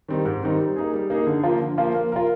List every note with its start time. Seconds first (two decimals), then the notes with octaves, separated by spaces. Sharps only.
0.08 D#3 G3 C4 D#4
0.25 G#2
0.43 D#3 G3 C4 D#4
0.59 G3
0.76 A#3 D#4 G#4
0.93 G3
1.10 A#3 D#4 G#4
1.27 D3
1.44 F3 A#3 F4 A#4
1.61 D3
1.78 F3 A#3 F4 A#4
1.95 A#3
2.12 F4 A#4